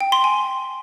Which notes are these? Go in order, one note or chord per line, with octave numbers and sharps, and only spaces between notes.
G5
C6
G#5